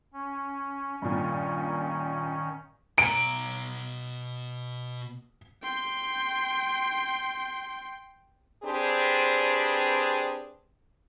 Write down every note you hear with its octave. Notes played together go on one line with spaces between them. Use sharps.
C#4
G2 A#2 D#3 C#4
B2 A#5 D7
G5 C6
C4 D4 G4 G#4 B4 C5